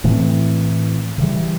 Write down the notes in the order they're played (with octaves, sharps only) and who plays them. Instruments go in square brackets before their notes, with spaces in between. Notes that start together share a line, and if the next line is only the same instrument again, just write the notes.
[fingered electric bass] A2 E3 A3 C4
C#3 E3 G3